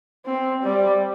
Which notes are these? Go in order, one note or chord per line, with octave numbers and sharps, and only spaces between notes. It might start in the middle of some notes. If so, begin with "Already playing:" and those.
C4
G3